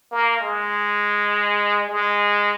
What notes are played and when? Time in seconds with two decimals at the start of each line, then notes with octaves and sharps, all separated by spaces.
0.11 A#3
0.40 G#3
1.89 G#3